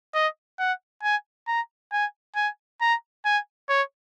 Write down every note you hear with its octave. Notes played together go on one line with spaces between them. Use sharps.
D#5
F#5
G#5
A#5
G#5
G#5
A#5
G#5
C#5